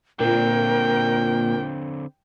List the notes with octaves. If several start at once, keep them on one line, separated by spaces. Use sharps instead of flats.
A#2 D3 C4 A#4 G5